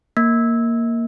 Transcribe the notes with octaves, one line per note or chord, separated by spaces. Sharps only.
A#3